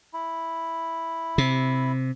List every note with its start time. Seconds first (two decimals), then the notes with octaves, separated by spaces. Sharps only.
0.13 E4
1.38 C3